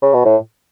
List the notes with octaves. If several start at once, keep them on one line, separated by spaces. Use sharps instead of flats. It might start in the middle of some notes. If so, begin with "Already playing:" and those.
C#3
B2
A2